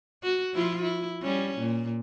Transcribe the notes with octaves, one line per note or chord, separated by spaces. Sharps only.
F#4
F3 E4 F4
E4
G3 C#4
A#2